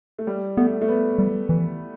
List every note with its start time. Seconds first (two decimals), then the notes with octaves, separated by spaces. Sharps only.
0.18 A3
0.27 G3
0.57 A3 B3
0.81 A3
0.88 B3
1.19 G3
1.49 E3